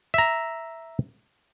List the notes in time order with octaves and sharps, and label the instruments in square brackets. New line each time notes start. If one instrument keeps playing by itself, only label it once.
[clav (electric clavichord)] E5 A#5